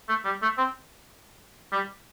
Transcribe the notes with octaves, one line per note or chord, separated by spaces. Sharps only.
A3
G3
A3
C4
G3